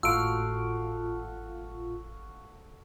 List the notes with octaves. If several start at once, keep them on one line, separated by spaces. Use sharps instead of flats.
G#1 A2 F4 F#4 A4 F5 E6 D7